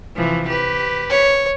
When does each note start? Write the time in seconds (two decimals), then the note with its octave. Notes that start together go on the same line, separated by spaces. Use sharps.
0.15 C3 E3 F3
0.48 G4 B4
1.10 C#5